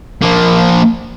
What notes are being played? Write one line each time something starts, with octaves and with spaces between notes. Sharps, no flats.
F3 A#3